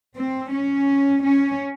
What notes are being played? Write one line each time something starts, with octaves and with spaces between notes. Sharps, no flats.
C4
C#4
C#4